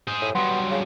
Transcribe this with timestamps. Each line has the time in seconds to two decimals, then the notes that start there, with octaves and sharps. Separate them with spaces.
0.08 G#4 C5
0.21 A2
0.35 G2 F#3 B3 C6
0.71 C#3